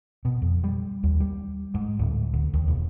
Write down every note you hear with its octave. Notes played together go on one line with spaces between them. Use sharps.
B2
F2
G3
D#2
G3
G#2
D1
D2
D#2
E1